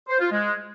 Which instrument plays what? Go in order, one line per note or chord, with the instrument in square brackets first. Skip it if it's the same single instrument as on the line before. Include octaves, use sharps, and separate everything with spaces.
[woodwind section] C5
F4
G#3